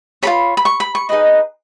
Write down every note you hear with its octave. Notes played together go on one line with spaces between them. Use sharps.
F4 A#4 C#5 B5
B5
C#6
B5
C#6
D#4 G#4 B4 D#5